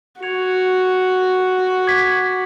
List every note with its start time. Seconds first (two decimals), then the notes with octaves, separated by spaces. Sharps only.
0.22 F#4 C#6 G#6 C#7 F7
1.87 D6 G#6 B6